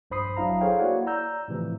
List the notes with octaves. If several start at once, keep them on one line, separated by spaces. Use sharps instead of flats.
A#1 G2 C5 B5 D#6 C7
G#1 F#3 D4 E4 F5 A#5
G#4 A4 C5 C#5 F5 G5
A#3 E4 F#4 C#5 D5 F#5
D5 A#5 E6 G6
A2 C3 E3 F3